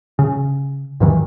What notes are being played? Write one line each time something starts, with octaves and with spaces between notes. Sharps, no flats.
C#3
D2 G2 D#3 E3